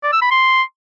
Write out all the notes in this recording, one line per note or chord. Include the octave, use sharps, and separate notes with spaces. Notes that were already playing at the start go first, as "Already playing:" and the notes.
D5
E6
B5
C6